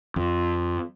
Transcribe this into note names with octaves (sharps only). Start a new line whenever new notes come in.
F2